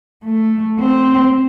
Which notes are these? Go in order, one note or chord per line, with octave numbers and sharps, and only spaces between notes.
A3
C4